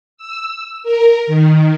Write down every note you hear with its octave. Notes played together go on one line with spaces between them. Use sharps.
E6
A#4
D#3